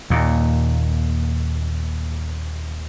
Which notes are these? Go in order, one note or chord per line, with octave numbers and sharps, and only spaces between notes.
D#2 A#2